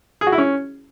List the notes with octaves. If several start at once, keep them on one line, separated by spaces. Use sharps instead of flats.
G#4
F#4
E4
C#4